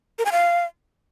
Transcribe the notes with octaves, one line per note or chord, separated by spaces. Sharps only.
A#4
G#5
F5